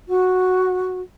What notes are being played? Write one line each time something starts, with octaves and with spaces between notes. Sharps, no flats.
F#4